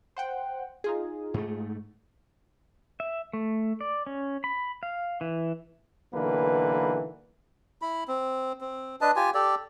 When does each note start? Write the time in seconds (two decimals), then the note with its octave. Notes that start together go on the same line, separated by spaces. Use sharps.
0.17 C5 F#5 G5
0.84 D#4 F4 G#4
1.34 G#2 A3
3.00 E5
3.33 A3
3.81 D5
4.07 C#4
4.44 B5
4.83 F5
5.21 E3
6.14 B1 D3 E3 A#3 B4
7.82 E4 B5
8.08 C4
8.61 C4
9.01 D4 B4 D#5 A5
9.16 F4 G4 G#5
9.34 G4 A4 D5